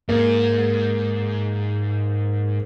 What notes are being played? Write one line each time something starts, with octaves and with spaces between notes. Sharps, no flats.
G#2 A#3